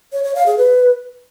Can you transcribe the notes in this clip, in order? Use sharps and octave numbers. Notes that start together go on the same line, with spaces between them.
C#5
C#5
F5
G#4
B4